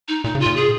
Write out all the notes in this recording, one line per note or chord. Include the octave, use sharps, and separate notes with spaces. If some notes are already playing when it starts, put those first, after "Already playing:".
D#4
A#2 D#4
C#3
F4
A#2
G#4